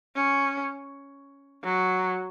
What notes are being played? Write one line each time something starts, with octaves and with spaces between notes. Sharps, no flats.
C#4
F#3